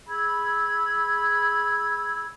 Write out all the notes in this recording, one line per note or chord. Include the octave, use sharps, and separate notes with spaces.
G#4 B5 E6 G#6